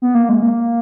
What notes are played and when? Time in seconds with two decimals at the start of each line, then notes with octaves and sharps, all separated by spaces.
0.02 B3
0.15 A#3
0.29 G#3
0.42 A#3